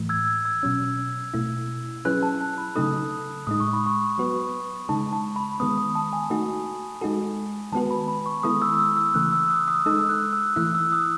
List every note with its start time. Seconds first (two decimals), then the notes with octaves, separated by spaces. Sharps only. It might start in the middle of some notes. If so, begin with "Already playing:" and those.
Already playing: A2 E3 A3
0.09 E6 G#6
0.45 E6 G#6
0.63 B2 F#3 C#4
1.34 B2 A3 E4
2.05 F#3 C#4 E4 G#4 B4 F#6
2.23 A5
2.41 A5
2.58 B5
2.76 C#3 F#3 A3 D#4 A4 D#6
3.47 A2 G#3 D#4 D#6
3.60 C#6
3.73 B5
3.86 C#6
4.18 F#3 B3 F#4 B4
4.89 C#3 G#3 D#4 A5
5.13 A5
5.36 B5
5.60 D#3 G#3 B3 D#6
5.78 D#6
5.95 A5
6.13 G#5
6.30 A3 D#4 F#4
7.01 G#3 D#4 F#4 A4
7.72 D#3 G#3 B3 F#4 B4 A5
7.91 B5
8.08 B5
8.26 C#6
8.43 D#3 G#3 B3 E4 A4 D#6
8.62 E6
8.79 E6
8.97 E6
9.14 C#3 E3 A3 F#6
9.32 E6
9.50 D#6
9.68 D#6
9.86 G#3 D#4 A4 E6
10.09 F#6
10.33 E6
10.56 E3 A3 E4 F#6
10.75 E6
10.92 D#6